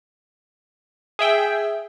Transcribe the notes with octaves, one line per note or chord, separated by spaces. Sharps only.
G#4 E5 G5